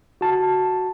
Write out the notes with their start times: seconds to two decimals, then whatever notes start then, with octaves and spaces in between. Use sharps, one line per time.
0.21 F#4 A5